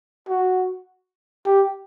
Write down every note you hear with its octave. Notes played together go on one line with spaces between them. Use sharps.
F#4
G4